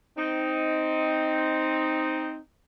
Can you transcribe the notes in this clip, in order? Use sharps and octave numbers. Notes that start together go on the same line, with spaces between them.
C4 D#4